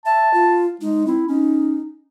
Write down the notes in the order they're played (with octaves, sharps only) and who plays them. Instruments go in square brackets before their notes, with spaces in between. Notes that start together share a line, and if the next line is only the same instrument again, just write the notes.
[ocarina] E5 [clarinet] A5
[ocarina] F4
[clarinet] G#3 [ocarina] D#4
[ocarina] C4 [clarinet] E4
[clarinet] C#4 [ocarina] D#4